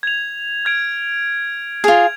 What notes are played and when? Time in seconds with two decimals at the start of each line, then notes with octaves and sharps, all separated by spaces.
0.03 G#6 F7
0.65 F6 G#6 D7
1.84 F4 G#4 G#6 F7